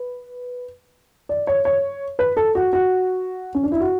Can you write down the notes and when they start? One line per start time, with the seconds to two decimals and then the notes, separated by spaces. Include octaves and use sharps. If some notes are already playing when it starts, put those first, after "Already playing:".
Already playing: B4
1.29 D5
1.47 C#5
1.65 C#5
2.19 B4
2.37 A4
2.55 F#4
2.73 F#4
3.55 C#4
3.63 D4
3.72 E4
3.80 F#4